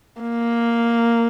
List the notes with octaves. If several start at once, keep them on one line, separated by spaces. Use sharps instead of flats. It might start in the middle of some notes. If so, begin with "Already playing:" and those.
A#3